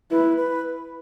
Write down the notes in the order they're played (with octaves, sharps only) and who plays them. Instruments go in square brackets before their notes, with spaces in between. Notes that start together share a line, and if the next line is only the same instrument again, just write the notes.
[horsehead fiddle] E4 [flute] B4
[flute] B4